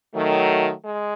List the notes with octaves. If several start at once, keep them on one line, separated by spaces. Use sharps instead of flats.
D#3 F#3 A3
G#3